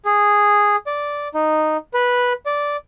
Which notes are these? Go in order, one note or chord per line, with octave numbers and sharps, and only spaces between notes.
G#4
D5
D#4
B4
D5